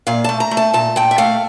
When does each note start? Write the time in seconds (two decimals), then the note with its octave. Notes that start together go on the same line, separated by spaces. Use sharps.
0.07 A#2 F5
0.24 A3 A5
0.40 A#5
0.51 A3
0.57 A5
0.74 A#2 A5
0.96 A#2 G5
1.11 E5
1.18 A3 F5